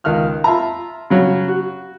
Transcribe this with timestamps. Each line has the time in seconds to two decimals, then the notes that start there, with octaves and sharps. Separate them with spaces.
0.04 C#2 D#3 F5 F6 F#6
0.44 F4 E5 A5 A#5
1.10 C#3 F#3 C#5
1.48 F#4